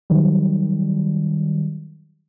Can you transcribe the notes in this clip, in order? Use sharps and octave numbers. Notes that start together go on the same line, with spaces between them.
D#3 F#3 G3